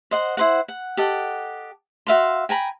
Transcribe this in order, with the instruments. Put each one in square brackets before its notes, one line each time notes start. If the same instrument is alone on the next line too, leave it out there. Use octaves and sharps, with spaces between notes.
[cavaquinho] C5 D#5 F#5
E4 C5 F#5
F#5
G4 A4 D#5 F#5
F#4 E5 F5 C6
G5 G#5 A#5 B5